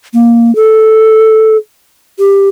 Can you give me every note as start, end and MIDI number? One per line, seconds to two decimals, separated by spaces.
0.14 0.54 58
0.56 1.57 69
2.19 2.49 67